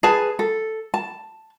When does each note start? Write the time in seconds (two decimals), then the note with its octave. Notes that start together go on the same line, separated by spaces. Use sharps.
0.03 G#4 B4 A5
0.39 A4
0.94 A5